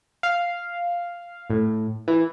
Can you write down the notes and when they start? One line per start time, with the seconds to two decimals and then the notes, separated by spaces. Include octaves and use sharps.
0.23 F5
1.50 A2
2.08 E3